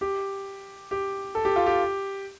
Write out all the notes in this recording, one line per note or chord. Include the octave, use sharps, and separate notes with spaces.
G4
G4
A4
G4
F4
G4